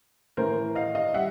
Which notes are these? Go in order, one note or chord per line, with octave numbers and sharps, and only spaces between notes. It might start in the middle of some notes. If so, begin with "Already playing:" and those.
A2 E3 A3 A#4 C5
D#5 F5
D#5 F5
G3 E5 F#5